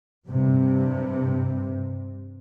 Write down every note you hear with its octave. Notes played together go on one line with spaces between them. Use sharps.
G2 C3